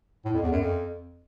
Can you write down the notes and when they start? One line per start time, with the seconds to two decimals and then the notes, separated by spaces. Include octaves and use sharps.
0.25 A2
0.34 F2
0.42 E2
0.51 F#2
0.60 F2